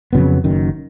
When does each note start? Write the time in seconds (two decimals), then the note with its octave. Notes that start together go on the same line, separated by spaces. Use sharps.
0.13 F2 C#3 F#3 B3
0.44 F#1 F#2 D#3